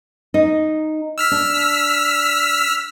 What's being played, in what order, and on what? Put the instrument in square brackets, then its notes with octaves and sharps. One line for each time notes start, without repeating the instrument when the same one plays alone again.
[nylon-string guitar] D#4
[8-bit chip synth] E6 F6 B6
[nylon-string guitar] D4